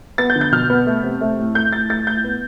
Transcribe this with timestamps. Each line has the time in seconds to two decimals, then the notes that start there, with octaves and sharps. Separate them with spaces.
0.18 B3 A6
0.30 G6
0.35 D3
0.41 G6
0.52 B2 F6
0.70 B3
0.87 A3
1.03 C3
1.21 A3
1.39 A2
1.55 A3 G6
1.73 A2 A6
1.90 A3 A6
2.07 A2 G6
2.24 B3